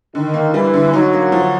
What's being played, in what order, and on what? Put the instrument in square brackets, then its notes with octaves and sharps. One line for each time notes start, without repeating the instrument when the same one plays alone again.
[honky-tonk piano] D3 [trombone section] D#3
[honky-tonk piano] A#3
[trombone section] E3 [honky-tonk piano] G3
[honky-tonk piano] D3
[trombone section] F#3 [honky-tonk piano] D#4
[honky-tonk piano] A#3
F3